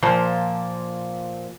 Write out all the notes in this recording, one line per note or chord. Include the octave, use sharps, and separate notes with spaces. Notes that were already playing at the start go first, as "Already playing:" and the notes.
A#2 F3 A#3 C5